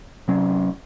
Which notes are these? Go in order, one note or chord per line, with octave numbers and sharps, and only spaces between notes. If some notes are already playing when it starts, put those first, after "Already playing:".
C3 F#3 C#4